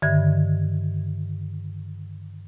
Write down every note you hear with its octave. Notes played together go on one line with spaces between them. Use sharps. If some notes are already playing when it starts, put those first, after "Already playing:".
G2 D3 D#3 E5 G#6